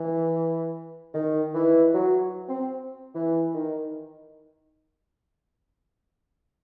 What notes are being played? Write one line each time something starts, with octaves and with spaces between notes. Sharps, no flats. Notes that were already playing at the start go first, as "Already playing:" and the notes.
Already playing: E3
D#3
E3
F#3
C4
E3
D#3